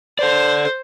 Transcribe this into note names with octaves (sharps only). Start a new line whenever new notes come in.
A4 C5 D5